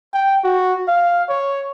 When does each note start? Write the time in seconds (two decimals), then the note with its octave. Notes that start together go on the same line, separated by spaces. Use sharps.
0.14 G5
0.44 F#4
0.88 F5
1.29 C#5